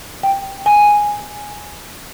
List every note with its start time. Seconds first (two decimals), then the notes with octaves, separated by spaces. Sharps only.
0.23 G5
0.66 G#5